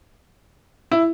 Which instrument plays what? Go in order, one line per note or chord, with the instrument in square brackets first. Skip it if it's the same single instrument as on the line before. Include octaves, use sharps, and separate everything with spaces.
[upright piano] E4